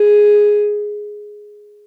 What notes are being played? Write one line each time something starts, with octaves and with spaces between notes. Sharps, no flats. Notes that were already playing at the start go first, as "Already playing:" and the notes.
Already playing: G#4